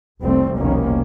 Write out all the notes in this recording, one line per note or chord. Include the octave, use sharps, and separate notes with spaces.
F1 C2 G3 A3 C4
F1 C2 B2 D#3 A#3 C#4